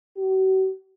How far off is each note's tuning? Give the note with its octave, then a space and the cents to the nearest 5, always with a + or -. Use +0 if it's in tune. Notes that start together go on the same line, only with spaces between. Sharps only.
F#4 +45